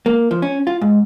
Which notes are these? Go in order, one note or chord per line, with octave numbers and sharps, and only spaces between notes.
A#3
F3
C#4
F4
G#2